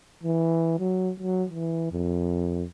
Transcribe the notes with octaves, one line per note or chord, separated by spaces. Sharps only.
E3
F#3
F#3
E3
F2